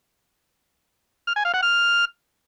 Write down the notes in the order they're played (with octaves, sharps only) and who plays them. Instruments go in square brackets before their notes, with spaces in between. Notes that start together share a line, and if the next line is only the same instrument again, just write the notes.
[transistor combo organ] F6
G#5
F5
F#5
F6